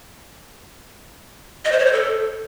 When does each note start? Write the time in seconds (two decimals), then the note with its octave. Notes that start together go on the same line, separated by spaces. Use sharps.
1.65 D#5
1.72 C5
1.79 C#5
1.86 C5
1.93 A4